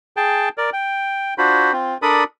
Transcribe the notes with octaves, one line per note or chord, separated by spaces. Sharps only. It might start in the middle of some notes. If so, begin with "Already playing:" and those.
G#4 G5 A5
A#4 D5
G5
D4 F4 F#4 C5 B5
C4 F4
D4 A4 A#4 D5 B5 D#6